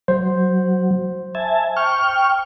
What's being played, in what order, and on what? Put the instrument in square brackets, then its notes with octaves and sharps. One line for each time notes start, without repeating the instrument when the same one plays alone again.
[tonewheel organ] F#3 [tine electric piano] C5
[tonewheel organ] E5 G#5 A5
G5 C#6 F6